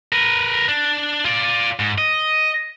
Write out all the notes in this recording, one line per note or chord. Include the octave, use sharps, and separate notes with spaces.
A#4 B4
D4
F4 D5
G#2
D#5